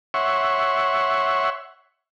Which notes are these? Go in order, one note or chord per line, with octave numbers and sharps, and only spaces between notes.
C#5 E5 F#5 C6 C#6